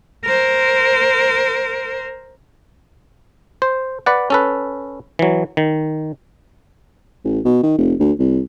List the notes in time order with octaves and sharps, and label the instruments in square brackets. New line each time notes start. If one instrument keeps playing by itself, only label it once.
[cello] A#4 C5
[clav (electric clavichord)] C5
B4 D5 F#5
C#4 A4 B4
E3 F#3
D#3
[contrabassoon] A1
B2
D#3
F1
D2
C2